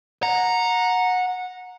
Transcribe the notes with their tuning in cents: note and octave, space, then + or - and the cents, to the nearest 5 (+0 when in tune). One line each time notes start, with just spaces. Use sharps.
F#5 -20 A#5 +0